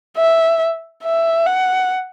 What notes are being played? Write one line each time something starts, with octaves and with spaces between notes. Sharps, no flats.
E5
E5
F#5